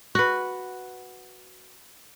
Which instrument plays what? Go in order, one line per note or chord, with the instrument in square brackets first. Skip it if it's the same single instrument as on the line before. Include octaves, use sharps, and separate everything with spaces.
[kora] F#4 B4